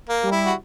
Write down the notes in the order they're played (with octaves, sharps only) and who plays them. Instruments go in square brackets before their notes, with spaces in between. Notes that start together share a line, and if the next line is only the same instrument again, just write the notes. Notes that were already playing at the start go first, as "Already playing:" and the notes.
[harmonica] A#3
[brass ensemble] G3
[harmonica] E4
F#4